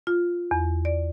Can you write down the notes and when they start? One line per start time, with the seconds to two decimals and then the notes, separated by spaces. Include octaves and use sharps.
0.07 F4
0.51 E2
0.85 D5